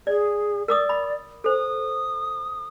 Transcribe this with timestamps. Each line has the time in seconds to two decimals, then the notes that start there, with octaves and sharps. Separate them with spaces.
0.07 G#4 D5
0.68 A#4 D5 D6 D#6
0.89 B5
1.44 A4 C5 D#6